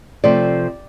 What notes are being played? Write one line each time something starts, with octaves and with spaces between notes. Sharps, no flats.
C3 F3 A3 C4 D5